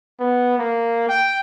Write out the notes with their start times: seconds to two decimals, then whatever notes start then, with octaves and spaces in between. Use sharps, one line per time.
0.20 B3
0.58 A#3
1.09 G5